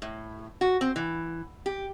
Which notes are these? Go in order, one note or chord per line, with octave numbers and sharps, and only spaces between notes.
A2
F#4
C4
E3
G4